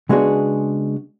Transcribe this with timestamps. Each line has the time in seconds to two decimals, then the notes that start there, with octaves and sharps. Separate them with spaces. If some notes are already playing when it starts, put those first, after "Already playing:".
0.09 C#3 G#3 B3 D4 F#4 G#4